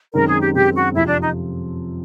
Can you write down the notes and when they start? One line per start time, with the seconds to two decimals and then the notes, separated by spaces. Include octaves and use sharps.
0.14 F#2 D#3 G#3 C4 D#4 A#4
0.27 G#4
0.40 G4
0.54 F#2 D#3 G#3 C4 D#4 G4
0.74 F#4
0.94 F2 C3 F3 E4
1.07 D4
1.21 D#4